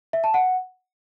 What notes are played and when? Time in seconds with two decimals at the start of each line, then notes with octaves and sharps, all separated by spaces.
0.13 E5
0.24 A5
0.34 F#5